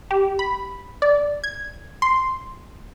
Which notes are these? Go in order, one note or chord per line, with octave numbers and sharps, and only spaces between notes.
G4
B5
D5
G#6
C6